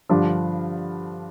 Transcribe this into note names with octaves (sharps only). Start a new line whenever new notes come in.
G2 D3 F3 D4